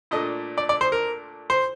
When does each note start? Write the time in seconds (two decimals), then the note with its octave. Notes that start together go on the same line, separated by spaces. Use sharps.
0.11 A#2 A3 D4 D#5
0.58 D5
0.69 D5
0.81 C5
0.92 A#4
1.50 C5